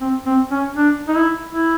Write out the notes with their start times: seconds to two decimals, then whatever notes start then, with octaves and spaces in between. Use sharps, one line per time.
0.01 C4
0.26 C4
0.51 C#4
0.77 D4
1.08 D#4
1.16 E4
1.53 E4